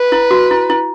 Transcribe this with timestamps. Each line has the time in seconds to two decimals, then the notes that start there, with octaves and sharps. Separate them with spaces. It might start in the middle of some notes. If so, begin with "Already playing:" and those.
Already playing: B4
0.12 E4
0.31 F#4
0.51 E4
0.70 E4